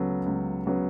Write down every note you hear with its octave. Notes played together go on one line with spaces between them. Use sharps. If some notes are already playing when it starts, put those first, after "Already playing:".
Already playing: C#2 C#3 F#3 B3 A4
C#2
C#3 F#3 B3